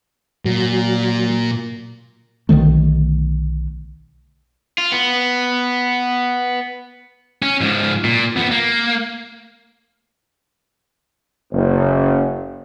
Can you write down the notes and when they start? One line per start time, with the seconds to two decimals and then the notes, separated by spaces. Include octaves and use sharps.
0.45 A#2 F#3
2.49 B1 D3 D#3 A3
4.78 F4
4.92 B3
7.42 C#4
7.61 G#2 F3
8.04 A#2
8.36 F2 B3
8.51 A#3
11.52 F#1